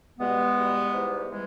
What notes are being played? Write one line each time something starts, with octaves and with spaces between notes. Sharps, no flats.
E2 B2 G3 G#3 B3
E2 B2 G3
G#2 E3 G3
E3 G3 G#3